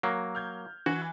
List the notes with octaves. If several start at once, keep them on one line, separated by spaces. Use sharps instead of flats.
F#3 A#3
F6 G6 G#6
E3 F#4 F#6